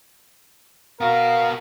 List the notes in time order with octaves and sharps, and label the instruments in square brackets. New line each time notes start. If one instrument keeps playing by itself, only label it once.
[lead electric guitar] B3 F#4 [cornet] A#4 [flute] F5